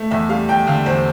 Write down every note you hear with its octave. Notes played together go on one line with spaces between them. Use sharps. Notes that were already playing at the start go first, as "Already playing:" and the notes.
Already playing: A3
E2 E5
G3 F5
E2 G5
D3 F5
E2 C5